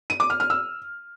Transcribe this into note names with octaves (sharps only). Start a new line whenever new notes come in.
D#7
D6
F6
F6
E6